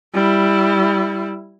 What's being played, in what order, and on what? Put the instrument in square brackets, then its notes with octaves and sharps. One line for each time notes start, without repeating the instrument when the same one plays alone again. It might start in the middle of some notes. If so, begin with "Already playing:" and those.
[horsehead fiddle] G3 E4